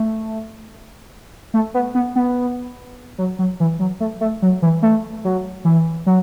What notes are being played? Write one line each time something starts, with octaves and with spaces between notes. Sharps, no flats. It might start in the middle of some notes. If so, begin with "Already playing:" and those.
Already playing: A3
A3
B3
B3
B3
F#3
F#3
E3
F#3
A3
A3
F#3
E3
A3
F#3
E3
F#3